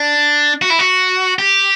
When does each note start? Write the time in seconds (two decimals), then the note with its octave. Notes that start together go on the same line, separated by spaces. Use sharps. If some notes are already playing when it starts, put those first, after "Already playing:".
Already playing: D4
0.62 F#4
0.70 E4
0.79 F#4
1.39 G4